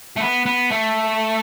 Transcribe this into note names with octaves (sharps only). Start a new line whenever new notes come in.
A3
B3
B3
A3